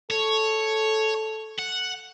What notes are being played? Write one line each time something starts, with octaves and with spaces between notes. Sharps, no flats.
A4 C#5
F#5